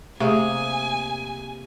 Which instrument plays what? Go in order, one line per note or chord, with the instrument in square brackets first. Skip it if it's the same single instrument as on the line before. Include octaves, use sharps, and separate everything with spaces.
[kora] C3 A#3 G#4 [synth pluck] A3 [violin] G#5